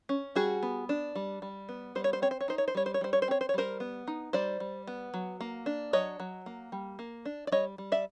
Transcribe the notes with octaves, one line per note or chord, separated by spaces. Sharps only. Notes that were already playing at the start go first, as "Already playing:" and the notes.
C#4
G3 F#4 G#4
B3
D4
G3
G3
B3
G3 C5
C#5
C5
C4 C#5
C5
C#5
D#4 C5
C#5
C5
G3 C#5
C5
C#5
G3 C5
C#5
C5
C4 C#5
C5
C#5
G3 A#4 C5
B3
D#4
G3 C5 D5
G3
B3
F#3
A#3
D4
F#3 C#5 D#5
F#3
A#3
G3
A#3
D4
D5
G3 C#5 D#5
G3
D5 E5